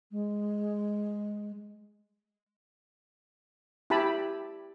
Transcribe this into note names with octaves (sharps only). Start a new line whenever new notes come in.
G#3
E4 G4 A5 B5